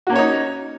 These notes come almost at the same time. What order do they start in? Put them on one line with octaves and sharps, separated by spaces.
F#4 A#3 C#4 C#5 D#4